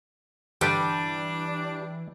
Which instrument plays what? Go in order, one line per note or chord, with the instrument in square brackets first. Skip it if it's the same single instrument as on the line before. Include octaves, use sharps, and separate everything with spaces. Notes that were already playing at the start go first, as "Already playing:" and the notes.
[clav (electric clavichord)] G2 D3 B4 [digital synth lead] E3 [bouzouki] G3 [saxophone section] D4